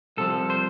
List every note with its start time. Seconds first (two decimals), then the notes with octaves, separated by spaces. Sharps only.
0.17 C2 C3 F3 A4
0.50 C5